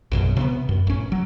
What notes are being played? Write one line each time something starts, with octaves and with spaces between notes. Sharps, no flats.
A#1 F#2 B2
C3 A#3 B3
F#2
A1 C#4
F#3